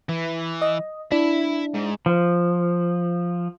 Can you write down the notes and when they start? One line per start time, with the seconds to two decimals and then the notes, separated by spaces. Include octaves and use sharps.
0.09 E3
0.62 D#5
1.12 D4 E4 E5 B5
1.75 G#2
2.06 F3